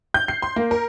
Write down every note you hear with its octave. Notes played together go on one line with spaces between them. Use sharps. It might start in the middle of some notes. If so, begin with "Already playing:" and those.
G6
C7
C6
A#3
A#4